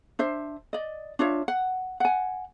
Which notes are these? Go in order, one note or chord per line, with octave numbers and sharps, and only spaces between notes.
D4 C5 E5
D5 D#5
D4 F4 C#5 E5
F#5
F#5 G#5